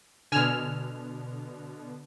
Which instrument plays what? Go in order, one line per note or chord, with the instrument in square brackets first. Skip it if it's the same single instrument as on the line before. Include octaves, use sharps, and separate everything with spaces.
[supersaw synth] B2 D3 [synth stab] G#5 E6 F6